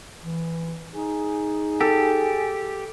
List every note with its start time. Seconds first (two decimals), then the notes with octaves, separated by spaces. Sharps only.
0.21 E3
0.95 D#4 G#4
1.81 G4 A4